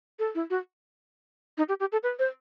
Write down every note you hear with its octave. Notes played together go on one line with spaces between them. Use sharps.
A4
E4
F#4
D#4
G4
G4
A4
B4
C5